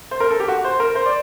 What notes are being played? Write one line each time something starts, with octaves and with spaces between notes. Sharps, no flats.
C5
A#4
A4
G4
F#4
C5
A#4
C5
D5